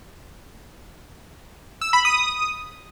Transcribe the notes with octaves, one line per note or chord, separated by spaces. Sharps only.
E6
B5
D#6